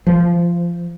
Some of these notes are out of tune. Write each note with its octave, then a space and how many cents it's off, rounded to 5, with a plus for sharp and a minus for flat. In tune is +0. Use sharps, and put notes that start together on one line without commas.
F3 -20